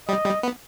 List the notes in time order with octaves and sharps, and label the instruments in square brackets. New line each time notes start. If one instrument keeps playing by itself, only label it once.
[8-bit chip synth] G3 [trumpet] D#5
[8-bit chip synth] G3
B3